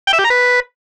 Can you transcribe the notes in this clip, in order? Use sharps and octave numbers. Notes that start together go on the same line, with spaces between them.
G5
E5
G4
A#5
B4